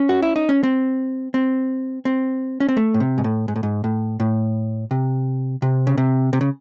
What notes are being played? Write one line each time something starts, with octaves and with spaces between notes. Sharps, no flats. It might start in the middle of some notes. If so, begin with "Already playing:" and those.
Already playing: C#4
F#4
E4
D#4
C#4
C4
C4
C4
C#4
C4
A3
A2
C3
G#2
A2
G#2
A2
G#2
A2
A2
C3
C3
C#3
C3
C3
C#3